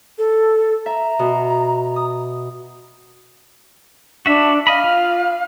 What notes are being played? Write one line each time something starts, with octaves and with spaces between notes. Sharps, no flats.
A4
E5 A#5
B2
D#6
D4 F#4 E5
D#5 F5 B5
F4